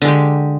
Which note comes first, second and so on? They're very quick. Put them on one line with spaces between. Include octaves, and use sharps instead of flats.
D3 G#3 G4